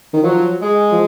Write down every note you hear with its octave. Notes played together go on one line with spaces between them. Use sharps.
D#3
F3 F#3
G#3
F3